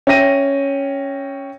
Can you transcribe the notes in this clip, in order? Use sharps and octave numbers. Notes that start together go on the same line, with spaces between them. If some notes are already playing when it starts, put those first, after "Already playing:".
C#4 E5 G5 A#6 D#7